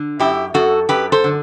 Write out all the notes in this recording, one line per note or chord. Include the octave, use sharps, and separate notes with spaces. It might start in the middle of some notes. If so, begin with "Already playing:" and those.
Already playing: D3
F#2 E4 G4
F#2 F#4 A4
F#2 G4 B4
A4 C5
D3